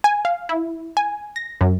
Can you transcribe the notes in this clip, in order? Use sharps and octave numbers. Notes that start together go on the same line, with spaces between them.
G#5
F5
E4
G#5
A#6
F#2